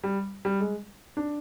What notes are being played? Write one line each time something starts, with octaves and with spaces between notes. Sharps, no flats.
G3
G3
G#3
D4